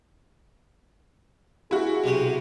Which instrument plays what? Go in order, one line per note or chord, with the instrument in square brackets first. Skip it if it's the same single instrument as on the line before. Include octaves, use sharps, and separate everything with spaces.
[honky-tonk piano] E4 F#4 [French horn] G#4
[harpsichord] B1 C3 G4